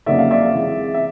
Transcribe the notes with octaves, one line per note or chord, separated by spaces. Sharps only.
F2 C#3 F#3 A#3 D#4 D5 E5
F5
D5 E5
C3 E3 G#3
E5